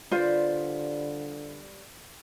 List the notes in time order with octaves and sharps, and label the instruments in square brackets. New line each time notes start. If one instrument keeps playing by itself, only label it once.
[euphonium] D3 [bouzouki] G3 B3 [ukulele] F4 C5